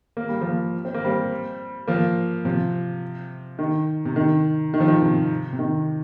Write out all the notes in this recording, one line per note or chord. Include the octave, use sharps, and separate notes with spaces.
A#3
G3
F3 A#3
C4
A#3
G3 C4
F3 A#3
C3 F3
D#3
C3
D#3
D#3
F3
D#3
C3
C3
D#3